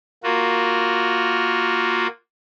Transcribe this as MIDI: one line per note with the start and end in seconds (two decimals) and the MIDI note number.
0.24 2.07 58
0.24 2.07 65
0.24 2.07 66